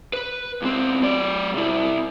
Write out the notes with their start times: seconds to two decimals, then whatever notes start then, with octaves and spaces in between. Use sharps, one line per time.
0.13 B4
0.62 C#2 C4
1.03 F#3 D5
1.54 C3 E4